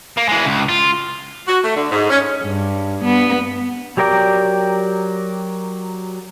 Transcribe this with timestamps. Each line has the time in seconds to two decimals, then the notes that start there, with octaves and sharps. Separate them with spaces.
0.17 A#3
0.28 E3 G#3
0.46 C#2
0.69 F4
1.47 F#4
1.63 A3
1.76 D3
1.91 G#2
2.09 C#4
2.43 G2
3.05 B3
3.97 F#3 G4 A#4 D5 G5